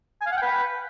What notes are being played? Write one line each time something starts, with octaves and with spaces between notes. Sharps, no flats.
G#5
F5
F#5
G5
B4